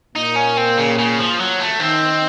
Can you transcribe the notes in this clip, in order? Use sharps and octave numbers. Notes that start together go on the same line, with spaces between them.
A#2 A#3 D#4
C#4
C4
C#3
C#3
F3
F#3
A3
D#3 C4 D#4